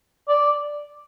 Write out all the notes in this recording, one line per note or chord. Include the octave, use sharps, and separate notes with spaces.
D5